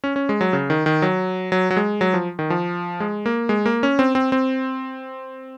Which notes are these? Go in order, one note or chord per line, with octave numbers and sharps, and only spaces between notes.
C#4
C#4
G#3
F#3
C#3
D#3
D#3
F#3
F#3
F#3
G#3
F#3
F3
D#3
F3
G#3
A#3
G#3
A#3
C#4
C4
C4
C4